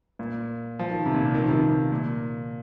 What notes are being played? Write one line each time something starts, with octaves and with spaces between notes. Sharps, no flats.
A#2
F3
D#3
C3
A#2
C3
D#3
F3
C3
D#3
C3
A#2